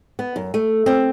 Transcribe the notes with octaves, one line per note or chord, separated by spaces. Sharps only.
B3
F#2
A3
C4